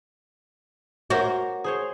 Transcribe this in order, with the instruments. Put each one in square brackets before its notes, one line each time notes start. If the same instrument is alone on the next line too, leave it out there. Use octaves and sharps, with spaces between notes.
[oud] F#4 [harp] A#4 C5 C#5
[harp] G#4 C5 C#5